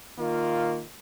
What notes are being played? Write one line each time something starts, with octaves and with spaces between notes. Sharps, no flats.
D#3 A#3 F4